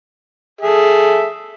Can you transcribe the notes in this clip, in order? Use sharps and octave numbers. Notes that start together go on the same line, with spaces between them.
G#4 A4 E5